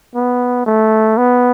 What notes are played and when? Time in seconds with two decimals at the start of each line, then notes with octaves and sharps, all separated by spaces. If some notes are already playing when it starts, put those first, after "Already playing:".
0.15 B3
0.66 A3
1.17 B3